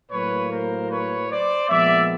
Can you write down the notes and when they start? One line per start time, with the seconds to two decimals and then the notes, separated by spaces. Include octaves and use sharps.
0.11 A2 F#3 A#3 B4 C#5
0.51 A#4 C5
0.90 B4 C#5
1.29 C5 D5
1.68 A#2 F3 G#3 B3 D5 E5